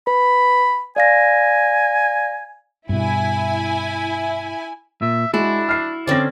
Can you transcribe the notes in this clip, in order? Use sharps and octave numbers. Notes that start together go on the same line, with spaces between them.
B4 B5
D5 F5 G#5 A#6
G2 B2 E4 G#5
A#2 E5
G#3 D4 E4 F#4
F6 C7
D3 C4 C#4 D5 A#6